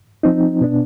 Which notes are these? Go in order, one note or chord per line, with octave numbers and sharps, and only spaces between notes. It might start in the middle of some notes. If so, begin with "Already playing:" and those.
F3 C4 D#4
B2 B3 D4